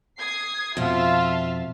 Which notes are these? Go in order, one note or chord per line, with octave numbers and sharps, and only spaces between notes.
D#6 G#6 C7
F2 B2 F4 E5 F5 A5